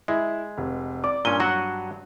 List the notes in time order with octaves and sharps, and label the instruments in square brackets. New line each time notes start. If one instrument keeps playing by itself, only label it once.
[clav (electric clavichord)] G#3 [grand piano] E4
[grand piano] F1
D5 D6
[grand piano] G2 D#7 G7 [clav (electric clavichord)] A#2 C#4
[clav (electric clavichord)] F#3 F#4 F#5